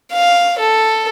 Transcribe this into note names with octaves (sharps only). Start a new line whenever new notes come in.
F5
A4